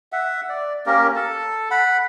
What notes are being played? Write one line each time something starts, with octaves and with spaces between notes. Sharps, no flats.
E5 F#5
D5
A#3 C#4 G4 A#4
A4 A5
F#5 B5